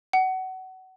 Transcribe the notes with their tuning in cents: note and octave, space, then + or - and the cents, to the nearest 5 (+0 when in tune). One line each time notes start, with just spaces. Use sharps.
F#5 +25